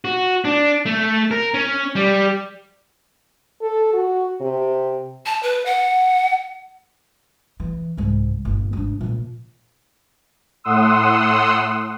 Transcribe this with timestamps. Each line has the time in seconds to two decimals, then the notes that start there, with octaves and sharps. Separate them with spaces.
0.05 F#4
0.45 D4
0.86 A3
1.31 A#4
1.54 C#4
1.95 G3
3.62 A4
3.93 F#4
4.41 C3
5.26 A5
5.43 B4
5.66 F#5
7.60 E3
7.97 C2 G#2
8.45 G1 A#2
8.73 G#2 D4
9.01 A#2 F3
10.64 A2 F#5 C6 D#6 E6